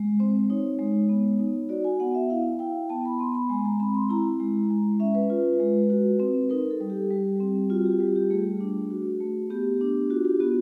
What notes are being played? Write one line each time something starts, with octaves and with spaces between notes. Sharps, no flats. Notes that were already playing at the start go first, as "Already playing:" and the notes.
Already playing: G#3
C4 C5
D#4 C#5
G#3
B3
D#4
F#4 D5
G#5
B3 F#5
E5
E4 F5
E4 G5
B3 A5
B5
B3 C6
B5
G#3 G#5
A#5
C4 B5
C6
E4 A#5
G#3
G#3
C#4 E5
B4
F4
G#3
F#4
C4
D#4 A#4
A4
G3
G4
G3
C4
F4 F#4
G4
G3 G4
G4
A3 G#4
D4
F#4
A3
B3 G4
D4
F4 F#4
G4
B3 F#4